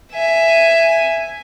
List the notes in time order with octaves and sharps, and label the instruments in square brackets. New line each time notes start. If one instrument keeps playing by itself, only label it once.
[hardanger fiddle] E5 G#5